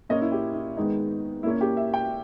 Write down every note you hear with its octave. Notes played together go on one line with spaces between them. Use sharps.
A#2 A#3 C#4 D#5
E4
G4
E4
G#2 D#3 G#3 B3 D#4
A#2 A#3 C#4 E4
G4
E5
G5